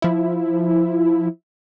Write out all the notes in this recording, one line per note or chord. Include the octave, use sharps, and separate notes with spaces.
F3 E4